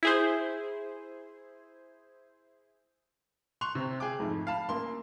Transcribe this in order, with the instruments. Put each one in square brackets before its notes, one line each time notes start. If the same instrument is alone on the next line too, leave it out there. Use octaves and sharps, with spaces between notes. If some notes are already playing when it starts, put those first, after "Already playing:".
[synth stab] E4 G#4 C5
[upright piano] C6 C#6 F#6 F7
C3 C4
G#4 G5 D6
F2 G#2 A3
F5 A5 B5
A1 A#3 C6